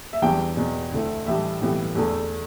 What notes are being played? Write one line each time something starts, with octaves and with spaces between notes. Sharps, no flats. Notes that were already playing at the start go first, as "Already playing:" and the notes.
E5
E2 E3 G3 B3 D4 G5
E2 B2 B3
D2 D3 A3 E4
A2 E3 G3 D4 E5
B1 A2 E3 G3 B3
E2 D3 A3 D4 A4